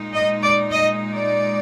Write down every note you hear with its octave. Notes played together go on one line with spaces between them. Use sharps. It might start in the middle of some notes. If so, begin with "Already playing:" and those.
Already playing: A#2 G#3 D#4
D#5
D5
D#5
D5